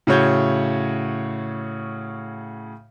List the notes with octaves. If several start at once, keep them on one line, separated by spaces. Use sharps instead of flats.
A2 C#3 F#4 C#5 G6